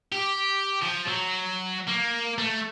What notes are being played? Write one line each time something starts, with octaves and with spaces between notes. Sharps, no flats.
G4
F3
F#3
A#3
A3